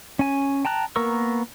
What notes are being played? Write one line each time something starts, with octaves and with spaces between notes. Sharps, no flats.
C#4 G#5
G5 A5 A#5 F#6
A#3 B3 A#4 C#6 E6